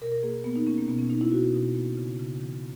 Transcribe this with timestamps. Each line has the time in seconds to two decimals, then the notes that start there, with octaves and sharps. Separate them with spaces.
0.01 B2 A#4
0.12 A#4
0.22 A#3 G#4
0.44 A#3 B3
0.56 D#4
0.67 A#3 C#4
0.78 A#3
0.88 B2 B3
0.99 C#4
1.10 A#3 D#4
1.21 E4
1.32 B2 F#4
1.54 B2
1.75 A#3
1.97 C#3
2.19 C#3
2.41 E3